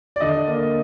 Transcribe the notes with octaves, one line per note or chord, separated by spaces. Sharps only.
D5
D3 D#5
A#3